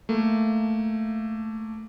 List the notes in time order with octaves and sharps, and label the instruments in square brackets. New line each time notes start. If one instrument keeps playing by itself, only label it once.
[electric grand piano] A3 A#3